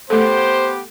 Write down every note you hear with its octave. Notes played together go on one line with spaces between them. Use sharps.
A3 B3 G4 A4 C5